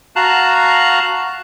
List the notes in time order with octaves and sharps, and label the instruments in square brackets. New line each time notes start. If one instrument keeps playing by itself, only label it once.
[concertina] F#4 F5 A5 A#5 F#6